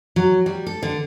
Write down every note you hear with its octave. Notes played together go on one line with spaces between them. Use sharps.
F#3
G3
A4
D3